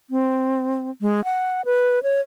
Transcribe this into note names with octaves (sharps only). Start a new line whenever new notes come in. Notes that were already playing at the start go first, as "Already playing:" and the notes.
C4
G#3
F#5
B4
C#5